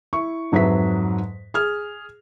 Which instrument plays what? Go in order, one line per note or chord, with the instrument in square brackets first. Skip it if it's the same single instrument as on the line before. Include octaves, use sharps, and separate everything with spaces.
[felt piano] E4 C#6
F2 G#2 F#3 B4 E5 B6
G#4 F6